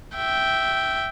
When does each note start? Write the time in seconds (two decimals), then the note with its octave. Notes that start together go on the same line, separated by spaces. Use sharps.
0.16 E5 G5